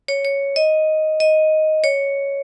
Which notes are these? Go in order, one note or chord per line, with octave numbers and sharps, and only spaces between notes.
C#5
C#5
D#5
D#5
C#5